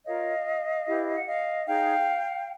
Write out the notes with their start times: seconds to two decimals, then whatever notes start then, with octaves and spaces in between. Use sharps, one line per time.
0.05 F4 A#4 C#5 D#5 F5
0.86 E4 G4 B4
1.15 F#5
1.26 D#5 F5
1.66 D#4 G#4 C#5 F5 G5